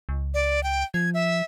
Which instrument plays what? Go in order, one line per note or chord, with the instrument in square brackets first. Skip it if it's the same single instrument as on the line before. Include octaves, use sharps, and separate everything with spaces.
[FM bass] C#2
[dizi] D5
G5
[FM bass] F3 [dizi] G#6
[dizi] E5